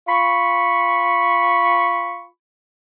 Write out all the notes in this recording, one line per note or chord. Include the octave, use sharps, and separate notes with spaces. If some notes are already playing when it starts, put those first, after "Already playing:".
F4 B5 C#6